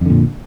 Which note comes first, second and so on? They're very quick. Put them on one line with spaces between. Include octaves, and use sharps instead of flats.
F2 D3 A#2